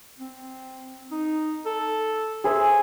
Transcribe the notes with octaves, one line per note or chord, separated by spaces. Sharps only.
C4
D#4
A4
G#4 C5 E5